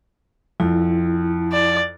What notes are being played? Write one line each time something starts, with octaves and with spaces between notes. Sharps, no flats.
F2 E4
D5